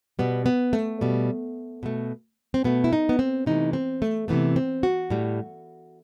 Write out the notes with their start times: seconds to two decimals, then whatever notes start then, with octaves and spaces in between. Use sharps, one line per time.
0.19 B2 G3 B3
0.46 B3
0.73 A3
1.01 B2 G3
1.83 B2 A3
2.54 C4
2.64 B2 A3 B3
2.84 E4
2.93 D#4
3.09 B3
3.19 C4
3.46 C3 E3 A3 D#4
3.73 C4
4.02 A3
4.28 C3 E3 A3 B3
4.56 C4
4.83 F#4
5.10 A2 G3